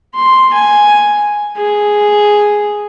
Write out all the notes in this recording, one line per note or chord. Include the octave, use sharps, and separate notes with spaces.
C6
G#5
G#4